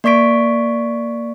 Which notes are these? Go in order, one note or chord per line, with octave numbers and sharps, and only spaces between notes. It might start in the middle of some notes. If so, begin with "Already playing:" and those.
A#3 D5 C#6 B6 D7